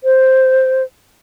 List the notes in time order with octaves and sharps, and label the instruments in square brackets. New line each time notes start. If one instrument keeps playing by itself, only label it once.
[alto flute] C5